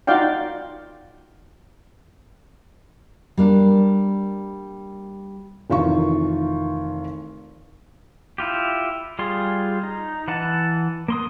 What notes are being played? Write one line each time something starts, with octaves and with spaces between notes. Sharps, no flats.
D#4 F4 F#4 D5 F5 G5
G3 A#3 D4
F1 D#3 E3 F4 A#4 C#6
E4 F4 G4
G3 F4 G#4 C6
D#4
E3 F#5 A5
A#3 C6 D#6